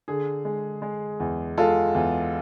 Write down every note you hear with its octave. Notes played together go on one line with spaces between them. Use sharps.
D3 G#4
G#3
G#3
E2
G#3 F4 A4
E2